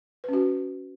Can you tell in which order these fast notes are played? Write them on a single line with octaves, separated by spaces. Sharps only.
B4 C#4 F#4